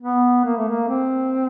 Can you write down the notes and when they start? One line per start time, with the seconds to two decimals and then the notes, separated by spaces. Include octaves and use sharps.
0.01 B3
0.45 A#3
0.57 A3
0.68 A#3
0.88 C4